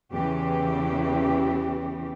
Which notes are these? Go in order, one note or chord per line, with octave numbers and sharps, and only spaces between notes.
E2 C#3 E3 G4